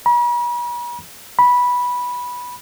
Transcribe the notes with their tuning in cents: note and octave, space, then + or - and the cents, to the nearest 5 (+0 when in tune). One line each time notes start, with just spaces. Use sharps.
B5 -45
B5 -10